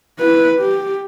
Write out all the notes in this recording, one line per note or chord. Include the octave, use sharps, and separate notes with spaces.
E4 B4
G4